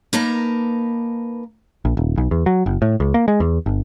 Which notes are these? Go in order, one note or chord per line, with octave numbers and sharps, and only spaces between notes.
A#3 D#4 A#4 B4 A5 A#5
A#1
D#1
B1
E2
F#3
F#1
A2
C#2
A#3
G#3
E2
G1